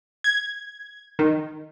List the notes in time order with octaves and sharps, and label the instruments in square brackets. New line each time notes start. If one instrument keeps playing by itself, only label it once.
[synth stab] G#6
D#3